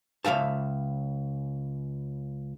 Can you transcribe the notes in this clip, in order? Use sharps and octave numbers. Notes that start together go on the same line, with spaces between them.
C#2 C#3 E5 F5 A5